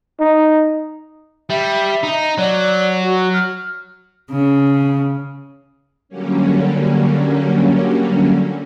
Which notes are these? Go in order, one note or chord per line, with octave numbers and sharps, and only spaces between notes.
D#4
G3 E5
D#4
F#3 D5
F#4
F6
C#3
D3 F#3 G3 A#3 C#4